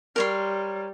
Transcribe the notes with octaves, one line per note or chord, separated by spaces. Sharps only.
G3 A#4 C#5 C6